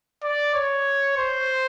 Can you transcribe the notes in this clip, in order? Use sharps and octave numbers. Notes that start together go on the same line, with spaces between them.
D5
C#5
C5